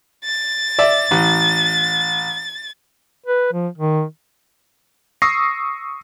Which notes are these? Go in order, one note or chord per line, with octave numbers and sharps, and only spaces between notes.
A6
D5 E5
A1
B4
F3
D#3
C#6 D#6 E6 A#6 C7